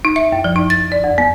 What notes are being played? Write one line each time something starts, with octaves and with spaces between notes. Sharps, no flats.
D#4
E5
F#2
F3
D#4
A6
D5
F2
B3